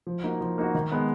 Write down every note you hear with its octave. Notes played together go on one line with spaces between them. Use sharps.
F3
A#3 D#4 F#4
F3
A#3 D#4 F#4
D#3
G#3 B3